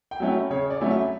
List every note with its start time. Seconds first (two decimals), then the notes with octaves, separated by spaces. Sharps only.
0.11 G5
0.20 F#3 A3 C#4 E4
0.50 C#3 C#5
0.70 D5
0.81 F#3 A3 C#4 E4
0.91 E5